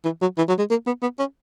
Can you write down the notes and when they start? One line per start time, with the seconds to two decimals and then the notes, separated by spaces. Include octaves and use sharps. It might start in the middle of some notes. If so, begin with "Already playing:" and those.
0.04 E3
0.21 F#3
0.38 E3
0.48 F#3
0.58 G#3
0.70 A#3
0.86 B3
1.02 B3
1.19 C#4